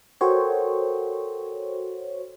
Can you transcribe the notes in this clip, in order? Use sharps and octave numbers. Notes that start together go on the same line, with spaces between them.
F#4 A4 A#4 C5 C#5 G5